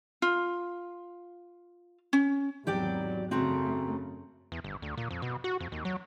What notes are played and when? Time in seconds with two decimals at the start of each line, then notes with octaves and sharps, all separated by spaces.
0.22 F4
2.13 C#4
2.67 G#1 E2 F#3 G4 D5 G5
3.31 F#2 C#3 A3 C4 F#4 A#5
4.52 E2
4.64 G1
4.82 D2
4.97 A#2
5.11 F2
5.22 B2
5.44 F#4
5.60 F2
5.72 D#2
5.85 F#3